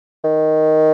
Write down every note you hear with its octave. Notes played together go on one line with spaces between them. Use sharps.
D#3